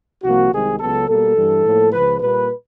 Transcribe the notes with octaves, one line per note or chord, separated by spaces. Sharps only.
C2 C3 F3 A#3 F#4
C2 C3 D#3 G#3 C4 G#4
C#2 C#3 F#3 B3 A4
B2 G3 A#3 A4
G2 E3 G3
A2 F3 A#3
C#2 C#3 F3 B4
A#2 G3 A#3 B4